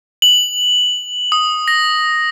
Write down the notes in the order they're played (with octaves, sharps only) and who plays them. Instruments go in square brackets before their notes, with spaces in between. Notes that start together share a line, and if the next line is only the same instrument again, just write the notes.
[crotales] F#7
D#6
A#6